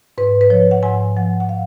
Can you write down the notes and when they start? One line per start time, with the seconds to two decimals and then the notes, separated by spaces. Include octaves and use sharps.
0.18 G#2 B4
0.41 B4
0.50 F3 C#5
0.71 F#5
0.83 G#2 G#5
1.17 F3 F#5
1.40 F#5
1.49 F5